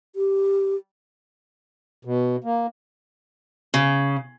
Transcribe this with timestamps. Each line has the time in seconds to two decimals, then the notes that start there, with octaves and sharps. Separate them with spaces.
0.16 G4
2.05 B2
2.44 A#3
3.74 C#3